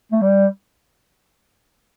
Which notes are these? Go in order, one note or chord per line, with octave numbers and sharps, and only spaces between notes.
A3
G3